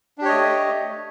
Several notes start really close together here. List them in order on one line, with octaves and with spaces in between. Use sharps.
D4 G4 C#5 D#5 A3